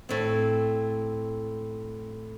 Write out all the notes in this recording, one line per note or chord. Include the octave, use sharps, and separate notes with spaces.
A2 C4